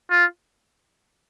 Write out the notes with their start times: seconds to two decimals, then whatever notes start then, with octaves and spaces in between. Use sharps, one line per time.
0.10 F4